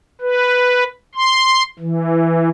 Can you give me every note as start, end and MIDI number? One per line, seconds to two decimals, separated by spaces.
0.21 0.84 71
1.15 1.63 84
1.79 2.49 52